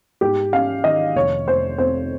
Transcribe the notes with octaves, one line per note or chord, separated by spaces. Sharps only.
G#2 G4
C#4 F5
D#3 D#5
F1 C#5
F1 C5
F2 C5